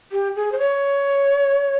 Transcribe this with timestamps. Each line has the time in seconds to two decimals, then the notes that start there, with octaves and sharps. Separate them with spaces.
0.12 G4
0.36 G#4
0.52 C5
0.58 C#5